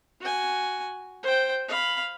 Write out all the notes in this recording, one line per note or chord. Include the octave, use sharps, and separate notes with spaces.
F#4 G#5
C5 G5
F5 B5